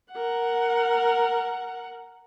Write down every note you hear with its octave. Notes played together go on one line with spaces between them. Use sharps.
A#4 F#5